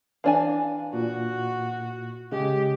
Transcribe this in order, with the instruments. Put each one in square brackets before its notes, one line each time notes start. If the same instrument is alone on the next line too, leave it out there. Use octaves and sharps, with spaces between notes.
[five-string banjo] E3 D4 G#5 [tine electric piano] F5
[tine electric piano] A#2 [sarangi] F#4
[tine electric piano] C#3 G#3 G#4 [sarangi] G4